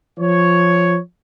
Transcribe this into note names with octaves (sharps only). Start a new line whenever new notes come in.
F3 C#5